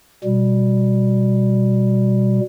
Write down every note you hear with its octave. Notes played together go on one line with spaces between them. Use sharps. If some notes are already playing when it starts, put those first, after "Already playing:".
B2 G3